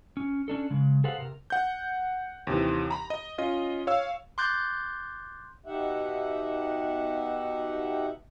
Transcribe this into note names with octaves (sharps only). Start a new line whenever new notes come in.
C#4
C#4 D4 A4
C#3 G#3
G#4 A4 B4 C5 F5 F#5
C3 A#4
F#5 G6
D#2 C3 E3
A#5 B5
D#5
C#4 F4 D#5
C#5 F5 E6
C6 D6 F#6 G6 A6
B2 D#4 G4 E5 F#5